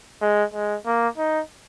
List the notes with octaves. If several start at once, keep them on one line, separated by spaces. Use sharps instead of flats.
G#3
G#3
A#3
D#4